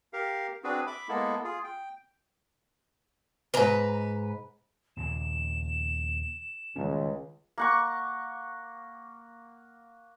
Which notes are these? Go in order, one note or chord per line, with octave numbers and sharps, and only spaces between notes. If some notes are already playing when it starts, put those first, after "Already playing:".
G4 A#4 F5
C4 D4 F#4 G#4 B4
E5 B5 D6
G#3 A#3 B3 E4 A4
F4 G#4
G5
F2 G#2 B4 A#5
D#2 A#2 C#3 E7
C#2 D#3 G3 C#4
A#3 F#5 C#6